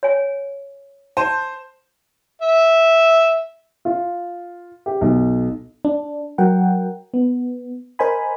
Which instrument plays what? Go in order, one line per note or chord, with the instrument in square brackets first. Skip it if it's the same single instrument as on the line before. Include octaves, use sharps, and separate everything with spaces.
[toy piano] C#5 G#5
[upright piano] C5 [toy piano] A5
[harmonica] E5
[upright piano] F4
G4
B1
[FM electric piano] D4
F#3 A#4 F#5 G5
B3
A#4 C5 D#5 G#5 B5